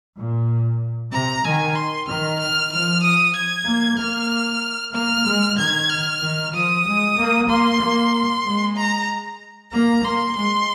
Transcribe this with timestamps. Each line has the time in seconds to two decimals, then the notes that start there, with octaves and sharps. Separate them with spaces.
0.17 A#2
1.12 C3 A#5
1.44 D#3 G#5
1.75 C6
2.07 D#3 F6
2.40 F6
2.71 F3 F6
3.03 D#6
3.36 G#6
3.68 A#3
3.98 A#3 F6
4.94 A#3 F6
5.27 G#3
5.58 D#3 G#6
5.90 F6
6.22 D#3
6.53 F3 D#6
6.86 G#3
7.18 A#3
7.49 A#3 C6
7.81 A#3
8.45 G#3
8.77 A#5
9.72 A#3 A#5
10.04 A#3 C6
10.36 G#3 C6